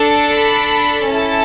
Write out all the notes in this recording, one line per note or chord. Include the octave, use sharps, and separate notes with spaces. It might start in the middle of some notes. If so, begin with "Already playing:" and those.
Already playing: D4 A4
B5
C#4 E4 A4 A5